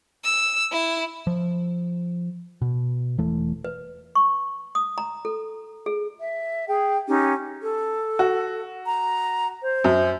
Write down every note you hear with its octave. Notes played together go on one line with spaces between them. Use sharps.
E6
E4
F3
B2
E1 E3 A3
B4
C#6
D#6
A#5
A4
G#4
E5
G#4 G5
C#4 D#4 G4
A4
F#4
A#5
C5
F#2